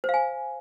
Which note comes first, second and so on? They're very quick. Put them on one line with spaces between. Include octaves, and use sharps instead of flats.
C5 F5 G#5